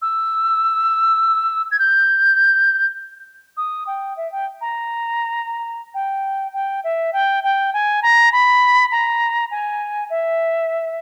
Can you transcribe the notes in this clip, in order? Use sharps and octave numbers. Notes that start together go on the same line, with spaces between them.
E6
G#6
G6
D#6
G5
E5
G5
A#5
G5
G5
E5
G5
G5
G#5
A#5
B5
A#5
G#5
E5